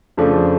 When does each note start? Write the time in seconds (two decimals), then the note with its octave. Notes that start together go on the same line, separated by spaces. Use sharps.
0.17 F2 C#3 F3 A3 D4